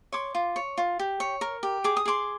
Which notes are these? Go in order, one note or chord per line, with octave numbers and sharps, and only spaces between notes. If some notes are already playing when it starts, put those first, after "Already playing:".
C#5 C6 D6
F4
C#5
F4
G4
C#5
A#4
G4
G#4 D6
D#6
G#4 C6 D6